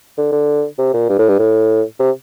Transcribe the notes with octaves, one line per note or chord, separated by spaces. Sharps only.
D3
D3
C3
A#2
G2
A2
G2
A2
C3